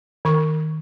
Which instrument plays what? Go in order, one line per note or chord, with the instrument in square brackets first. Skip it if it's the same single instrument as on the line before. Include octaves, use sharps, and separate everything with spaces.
[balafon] D#3 C#6